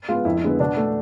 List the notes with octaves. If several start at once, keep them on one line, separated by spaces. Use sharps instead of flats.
G#3 B3 F4
F2 E4
D3 G#3 B3
B2 D4
A3